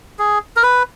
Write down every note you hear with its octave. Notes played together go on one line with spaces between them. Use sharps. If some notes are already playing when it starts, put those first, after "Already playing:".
G#4
A#4
B4